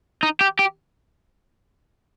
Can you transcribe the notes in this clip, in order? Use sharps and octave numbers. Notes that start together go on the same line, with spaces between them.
D#4
G4
G4